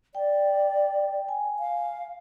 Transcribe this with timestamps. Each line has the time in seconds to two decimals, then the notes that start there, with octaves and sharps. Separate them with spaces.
0.15 D5 G5
1.29 G#5
1.59 F5